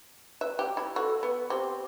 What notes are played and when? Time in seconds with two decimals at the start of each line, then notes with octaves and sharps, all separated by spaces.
0.41 B4 E5
0.59 G4
0.77 E4
0.96 F#4 A4
1.23 B3
1.50 C4 G4